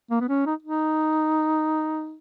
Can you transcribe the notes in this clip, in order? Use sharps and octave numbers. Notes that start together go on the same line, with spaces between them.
A#3
B3
C#4
D#4
D#4